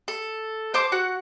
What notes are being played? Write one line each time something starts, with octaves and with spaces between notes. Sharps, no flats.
A4
C5 A5 D6
F#4 F#5